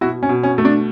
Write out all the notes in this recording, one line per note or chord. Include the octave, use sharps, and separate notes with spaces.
B2 E4 F#4
C#4
B2
C#4
A3
D4